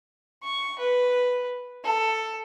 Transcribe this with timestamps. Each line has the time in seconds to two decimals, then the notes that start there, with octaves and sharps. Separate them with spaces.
0.43 C#6
0.79 B4
1.85 A4